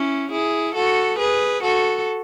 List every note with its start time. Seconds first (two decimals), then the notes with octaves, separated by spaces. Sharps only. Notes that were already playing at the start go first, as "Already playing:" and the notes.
Already playing: C#4 E4
0.31 E4 G#4
0.74 F#4 A4
1.18 G#4 B4
1.62 F#4 A4